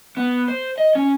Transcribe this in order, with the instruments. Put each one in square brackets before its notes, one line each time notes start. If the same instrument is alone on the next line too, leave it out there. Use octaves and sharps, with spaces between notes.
[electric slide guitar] B3
C5
D#5
C#4